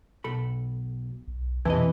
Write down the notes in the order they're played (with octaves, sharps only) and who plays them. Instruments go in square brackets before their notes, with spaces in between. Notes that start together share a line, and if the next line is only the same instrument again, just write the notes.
[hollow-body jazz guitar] B1 A4 B5
[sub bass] B1
[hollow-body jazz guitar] B1 C3 D#5 [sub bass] F2 [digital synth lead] E3 [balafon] B4 A5